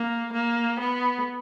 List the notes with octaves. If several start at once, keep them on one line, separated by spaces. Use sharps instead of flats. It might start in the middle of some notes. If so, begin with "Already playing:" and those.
Already playing: A#3
A#3
B3